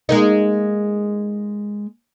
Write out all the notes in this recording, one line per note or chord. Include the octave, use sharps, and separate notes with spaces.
G#3 A#3 D#4